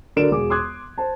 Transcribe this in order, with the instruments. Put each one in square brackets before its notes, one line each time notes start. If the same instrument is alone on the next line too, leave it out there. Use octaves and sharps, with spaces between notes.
[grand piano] D3 F#4 A#4 D5 D7 E7
E1 G#4 D6
C6 D6 D#6 F#6 G#6
C5 A5